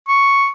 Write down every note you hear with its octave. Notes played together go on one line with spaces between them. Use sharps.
C#6